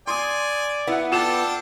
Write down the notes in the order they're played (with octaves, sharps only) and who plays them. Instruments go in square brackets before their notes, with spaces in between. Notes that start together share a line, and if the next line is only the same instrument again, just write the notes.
[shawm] D5 [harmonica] G#5 [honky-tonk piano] C6 D#6
[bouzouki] B3 [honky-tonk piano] E4 F#5
[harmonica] D4 G5 A5 [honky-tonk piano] F4 E7 [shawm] A4